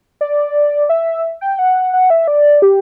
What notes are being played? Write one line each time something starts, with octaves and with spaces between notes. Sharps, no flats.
D5
E5
G5
F#5
F#5
E5
D5
G4